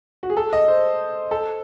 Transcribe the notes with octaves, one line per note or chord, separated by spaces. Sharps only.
F#4
G#4
A4
D#5
C5
A4